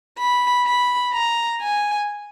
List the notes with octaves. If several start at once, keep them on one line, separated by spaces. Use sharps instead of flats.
B5
B5
A#5
G#5